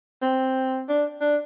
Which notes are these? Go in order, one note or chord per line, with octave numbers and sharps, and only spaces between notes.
C4
D4
D4